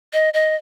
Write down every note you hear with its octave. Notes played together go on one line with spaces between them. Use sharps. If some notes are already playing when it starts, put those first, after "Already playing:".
D#5
D#5